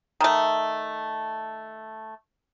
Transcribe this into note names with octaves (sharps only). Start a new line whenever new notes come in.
D#3 A3